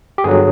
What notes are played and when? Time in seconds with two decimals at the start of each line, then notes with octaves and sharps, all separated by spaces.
0.18 G4
0.24 G1 G2 D3 F#3 G#4